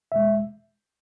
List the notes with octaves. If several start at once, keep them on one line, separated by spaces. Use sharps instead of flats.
E2 B2 G#3 E5